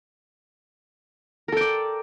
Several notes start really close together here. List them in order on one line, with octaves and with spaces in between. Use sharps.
A#4 A4 G5 D5